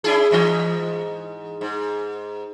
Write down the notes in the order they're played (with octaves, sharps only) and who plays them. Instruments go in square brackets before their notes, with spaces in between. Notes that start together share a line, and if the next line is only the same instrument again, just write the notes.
[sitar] C#4 E4 G#4
G#2 E3 D#5
G#2